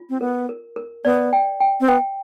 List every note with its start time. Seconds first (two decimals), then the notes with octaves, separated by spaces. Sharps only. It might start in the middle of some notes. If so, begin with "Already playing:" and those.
Already playing: F4
0.10 C4
0.21 B3 A#4
0.49 A#4
0.76 A#4
1.05 B3 D5
1.33 G5
1.60 G5
1.80 C4
1.88 B3 G5